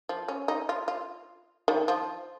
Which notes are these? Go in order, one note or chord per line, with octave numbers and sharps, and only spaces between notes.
F3
C#4
D#4
F4
F4
D#3
F3